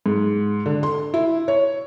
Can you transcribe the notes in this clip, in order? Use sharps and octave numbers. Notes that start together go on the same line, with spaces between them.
G#2
D3
C6
E4
C#5